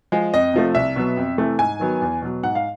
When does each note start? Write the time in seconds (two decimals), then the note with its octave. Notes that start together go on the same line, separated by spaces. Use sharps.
0.12 F3 G#3
0.34 F2 D#5
0.54 C3 F3 A3
0.75 C2 E5
0.96 B2 F#3 B3
1.17 F2
1.38 C3 E3 A3
1.59 G#2 G#5
1.80 D#3 F#3 B3
2.02 E2
2.22 B2 F#3
2.43 G#2 F#5
2.55 F5